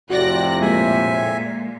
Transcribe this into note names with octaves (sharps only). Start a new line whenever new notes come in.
F2 A2 C3 F#4 D5 F#6 A#6
A#2 G#3 A#3 E5 G#5